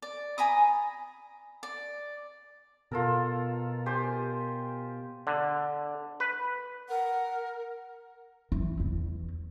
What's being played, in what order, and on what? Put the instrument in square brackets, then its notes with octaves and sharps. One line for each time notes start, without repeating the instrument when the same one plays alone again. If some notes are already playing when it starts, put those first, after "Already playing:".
[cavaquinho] D5
G#5 A#5 B5 D#6
D5
[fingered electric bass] B2 [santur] F4 A4 A#4
[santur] G4 C5 G#5
[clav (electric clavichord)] D3
B4
[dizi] A#4 [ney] F#5
[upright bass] E3
E2